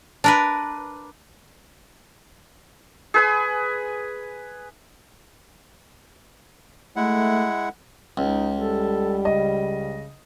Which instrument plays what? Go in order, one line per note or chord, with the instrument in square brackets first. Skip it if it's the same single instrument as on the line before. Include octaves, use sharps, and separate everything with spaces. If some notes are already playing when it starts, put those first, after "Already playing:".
[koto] D4 A#4 B4
[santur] G#4 B4 G#5
[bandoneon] G#3 E4 F#5 [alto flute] A3
[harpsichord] C#2 [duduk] D#4
[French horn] G3 [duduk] A4
[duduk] C#3 [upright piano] D#5